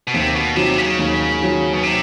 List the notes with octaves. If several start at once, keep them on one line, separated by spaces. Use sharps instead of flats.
B2
D#2 C3
B2
C3 D#3 F#3
C#3
D#2
D#3 F#3
B2
C3